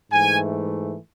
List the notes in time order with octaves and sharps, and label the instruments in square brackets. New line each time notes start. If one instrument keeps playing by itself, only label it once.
[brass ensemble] G#2 E3 A3 G#5